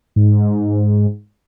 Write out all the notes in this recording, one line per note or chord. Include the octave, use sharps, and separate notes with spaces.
G#2